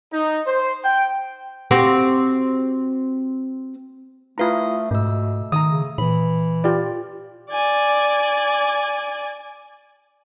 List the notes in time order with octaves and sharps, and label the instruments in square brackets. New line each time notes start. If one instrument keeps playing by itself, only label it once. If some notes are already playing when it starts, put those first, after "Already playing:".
[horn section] D#4
C5
G5
[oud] C4 F#4 G4
[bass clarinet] A3 [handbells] E4 F5 D#6 [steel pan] F4 B4 A#5
[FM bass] G#2 [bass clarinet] B2 [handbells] A3 E6
[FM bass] D#3 [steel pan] A#5 D#6
[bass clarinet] C#3
[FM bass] A#2 [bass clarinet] E3 [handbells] B5
[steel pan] F4 G4 D5
[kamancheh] D5 G#5